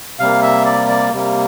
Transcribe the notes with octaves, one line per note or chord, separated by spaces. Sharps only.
C3 G3 A#3 F5
E5
D5
D5
C3 G3 A#3